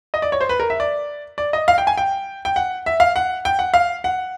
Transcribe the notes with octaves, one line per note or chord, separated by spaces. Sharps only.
D#5
D5
C#5
C5
B4
A#4
E5
D5
D5
D#5
F5
G5
G#5
G5
G5
F#5
E5
F5
F#5
G5
F#5
F5
F#5